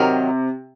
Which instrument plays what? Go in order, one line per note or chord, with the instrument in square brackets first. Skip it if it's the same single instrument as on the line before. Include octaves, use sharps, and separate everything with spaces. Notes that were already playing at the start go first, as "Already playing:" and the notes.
Already playing: [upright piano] C3 [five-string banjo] D#3 F#3 A#4